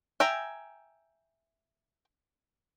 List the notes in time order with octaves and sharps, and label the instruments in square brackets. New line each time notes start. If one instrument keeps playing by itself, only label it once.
[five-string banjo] E5 G5 G#5 A#5